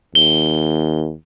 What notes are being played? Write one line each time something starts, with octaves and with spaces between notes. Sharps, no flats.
D#2 G7